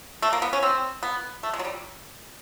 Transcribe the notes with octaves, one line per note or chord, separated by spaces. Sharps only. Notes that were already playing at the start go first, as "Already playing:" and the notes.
A3
A#3
B3
C#4
C4
B3
A3
G#3
F#3
G3